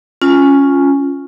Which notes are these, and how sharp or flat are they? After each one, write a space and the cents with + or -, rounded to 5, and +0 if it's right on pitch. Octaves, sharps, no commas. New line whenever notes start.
C#4 +0 F4 +0 G#5 +0